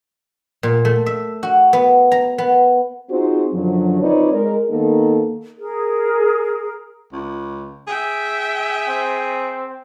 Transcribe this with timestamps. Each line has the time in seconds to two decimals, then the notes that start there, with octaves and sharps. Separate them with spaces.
0.63 A#2
0.85 A3
1.06 E5
1.43 F#4
1.73 B3
2.12 A#5
2.38 B3
3.10 C4 D#4 F4 F#4 G#4 C5
3.53 F#2 D3 F3 F#3
4.01 C4 D#4 F4 B4 C#5 D5
4.32 G#3 A#4
4.70 D#3 A#3 B3 D#4 A4
5.58 G#4 A#4
7.13 C#2
7.87 G#4 E5 G5
8.88 C4